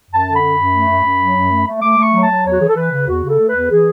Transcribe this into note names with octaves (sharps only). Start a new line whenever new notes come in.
F#2
A5
D3
B5
F#2
F#2
A3
F#2
F#2
F#3
F#2
A3
A3
A3 D6
A3
C#6
F#3
A5
F#3
E2 C#5
F#4
E3 G#4
A4
E3 B4
C#3
E2 F#4
C#3
A4
A3
B4
E2
E3 G#4